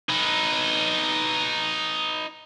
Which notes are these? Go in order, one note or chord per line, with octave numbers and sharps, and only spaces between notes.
D#4 B4